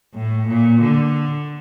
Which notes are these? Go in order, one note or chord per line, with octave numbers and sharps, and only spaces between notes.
A2
A#2
D3